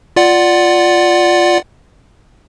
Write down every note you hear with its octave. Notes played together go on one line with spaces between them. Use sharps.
F4 D5 F#5